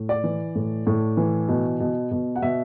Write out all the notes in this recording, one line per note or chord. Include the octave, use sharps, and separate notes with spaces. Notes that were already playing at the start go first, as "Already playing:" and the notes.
Already playing: A2
D5
E3
A2
A2
E3
B2
B2
B2
F#5
B2 E5